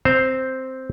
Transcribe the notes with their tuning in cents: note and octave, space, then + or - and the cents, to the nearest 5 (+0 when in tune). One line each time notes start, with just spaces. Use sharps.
C4 +0 C5 +0 A#5 +0